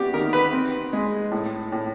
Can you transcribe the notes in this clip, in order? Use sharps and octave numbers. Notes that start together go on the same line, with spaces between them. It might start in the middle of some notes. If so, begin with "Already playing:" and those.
Already playing: B3 F#4 G4
D#3 A#4
B4
C4
G#3
A2
A2